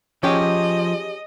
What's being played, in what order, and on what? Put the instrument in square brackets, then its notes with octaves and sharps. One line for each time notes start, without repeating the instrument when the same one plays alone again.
[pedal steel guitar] F3 [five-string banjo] C#4 G4 G#4 [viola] D#5